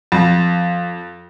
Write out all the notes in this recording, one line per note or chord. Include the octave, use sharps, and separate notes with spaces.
F2